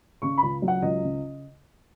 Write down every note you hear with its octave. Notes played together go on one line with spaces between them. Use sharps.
C#3 C#6
C#2 B5
F#3
F#5
C#2 D#5
C#3